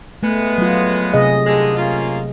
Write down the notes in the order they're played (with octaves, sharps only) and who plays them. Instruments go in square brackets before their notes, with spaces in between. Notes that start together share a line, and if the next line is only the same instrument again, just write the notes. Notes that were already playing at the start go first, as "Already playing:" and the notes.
[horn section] G#3 B3 [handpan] A3
[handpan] F#3 F4
C3 G#4 D#5
[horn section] D3 D#3 G#3
A#3 C#4 F4